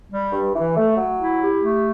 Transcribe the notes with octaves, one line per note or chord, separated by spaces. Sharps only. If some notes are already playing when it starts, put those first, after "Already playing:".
G3
G2
E3
A3
F#3
E4
G4
A3